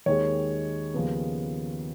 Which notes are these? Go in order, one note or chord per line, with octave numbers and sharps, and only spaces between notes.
D#2 D#3 G#3 C#5
D#2 C#3 F3 B3